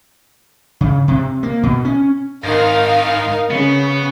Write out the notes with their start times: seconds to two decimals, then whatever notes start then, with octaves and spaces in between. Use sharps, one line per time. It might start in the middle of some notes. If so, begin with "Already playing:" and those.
0.81 C#3
1.08 C3
1.43 A#3
1.63 B2
1.85 C#4
2.44 G#2 D#3 D#4 A#4 F5
3.51 C#3 B3